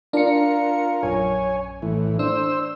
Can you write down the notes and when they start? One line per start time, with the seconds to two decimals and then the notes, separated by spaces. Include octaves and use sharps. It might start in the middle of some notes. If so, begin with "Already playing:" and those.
0.13 D4 F4 A#4 C#7
1.03 A#1 F#2 C#5 G#5
1.82 A2 E3
2.19 D4 C5 E6